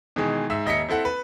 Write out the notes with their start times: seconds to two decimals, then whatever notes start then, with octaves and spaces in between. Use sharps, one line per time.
0.16 B2 D#3 E3 G#3
0.50 G#2 E5 E6
0.66 D#1 D#5 E5 B6 C#7
0.88 C4 E4 A4 F#5
1.05 B4